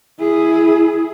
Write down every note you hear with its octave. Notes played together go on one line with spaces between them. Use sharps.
E4 G#4